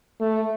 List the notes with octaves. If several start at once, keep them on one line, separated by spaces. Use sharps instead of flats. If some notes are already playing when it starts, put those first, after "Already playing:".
A3